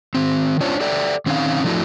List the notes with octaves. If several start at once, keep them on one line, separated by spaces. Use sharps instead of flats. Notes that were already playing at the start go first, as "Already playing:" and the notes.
D#3 C4
C#4 D4 F4 C5 C#5
G4 A4 D5 E5 G5
D#3 C4 C#4 D#4 F5
D3 F3 A3 D4 E4 F#4